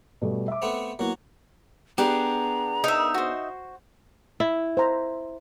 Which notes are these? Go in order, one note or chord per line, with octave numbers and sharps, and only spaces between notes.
B2 G3 A3
E5 D6
A3 B3 C4
F#3 A#3 B3 E4 F#4
B3 D4 G4 G#4 A#5
D#4 A#4 E5
F#4 C5
E4
C5 E5 A#5